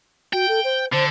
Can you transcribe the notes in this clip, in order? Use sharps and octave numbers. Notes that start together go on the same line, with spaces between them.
F#4 G5
A4
C5
D3 C5